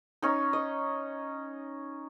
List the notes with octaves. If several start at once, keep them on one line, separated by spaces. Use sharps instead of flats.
C#4 D#4
D#5